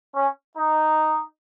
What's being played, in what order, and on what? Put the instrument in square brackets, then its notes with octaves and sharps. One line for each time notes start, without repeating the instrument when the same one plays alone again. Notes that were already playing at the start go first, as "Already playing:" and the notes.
[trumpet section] C#4
D#4